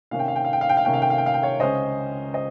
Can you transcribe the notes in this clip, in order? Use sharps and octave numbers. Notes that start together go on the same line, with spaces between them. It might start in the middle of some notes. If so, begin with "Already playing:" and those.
C3 D#3 A#3 C#4 F5
G5
F5
G5
F5
G5
F5
G5
F5
C3 D#3 A#3 C#4 G5
F5
G5
F5
G5
F5
G5
C#5 F5
C#2 C#3 G#3 C#4 C5 D#5
C5 D#5